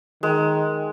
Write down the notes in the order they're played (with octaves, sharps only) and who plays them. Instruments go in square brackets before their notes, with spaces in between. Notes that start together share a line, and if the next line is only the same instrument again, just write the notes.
[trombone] D#3 [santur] G#3